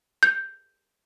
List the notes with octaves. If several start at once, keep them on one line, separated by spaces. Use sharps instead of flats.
G6